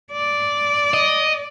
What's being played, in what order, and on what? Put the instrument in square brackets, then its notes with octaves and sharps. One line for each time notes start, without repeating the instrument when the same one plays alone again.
[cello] D5
[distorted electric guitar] D#5